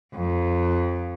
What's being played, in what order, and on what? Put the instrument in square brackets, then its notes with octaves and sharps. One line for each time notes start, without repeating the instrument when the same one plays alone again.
[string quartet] F2